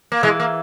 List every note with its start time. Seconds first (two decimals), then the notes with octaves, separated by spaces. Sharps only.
0.12 A#3
0.23 E3 G#3
0.40 A#3